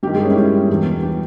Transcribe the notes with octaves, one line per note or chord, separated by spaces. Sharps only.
G2 D#3 G3 G4
G#3 G#4
C#4 C#5
E4
G3 G4
E2 B2
G3 G4